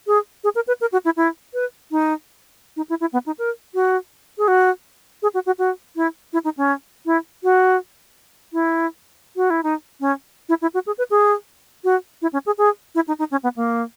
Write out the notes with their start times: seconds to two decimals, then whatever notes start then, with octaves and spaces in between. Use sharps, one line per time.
0.07 G#4
0.44 G#4
0.55 A#4
0.67 B4
0.81 A#4
0.92 F#4
1.05 E4
1.17 E4
1.54 B4
1.91 D#4
2.76 D#4
2.89 E4
3.01 E4
3.13 B3
3.26 D#4
3.39 A#4
3.74 F#4
4.38 G#4
4.48 F#4
5.22 G#4
5.34 F#4
5.46 F#4
5.58 F#4
5.96 E4
6.33 E4
6.44 D#4
6.57 C#4
7.06 E4
7.43 F#4
8.53 E4
9.36 F#4
9.50 E4
9.63 D#4
10.00 C#4
10.49 E4
10.62 E4
10.74 F#4
10.87 G#4
10.98 B4
11.10 G#4
11.84 F#4
12.22 E4
12.33 C#4
12.46 G#4
12.58 G#4
12.95 E4
13.08 D#4
13.19 D#4
13.31 C#4
13.43 B3
13.56 A#3